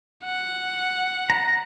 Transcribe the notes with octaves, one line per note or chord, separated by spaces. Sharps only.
F#5
A#5